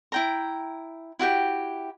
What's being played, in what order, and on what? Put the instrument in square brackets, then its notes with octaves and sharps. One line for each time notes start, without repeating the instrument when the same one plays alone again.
[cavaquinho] E4 G5 A#5
E4 F#4 G4 G5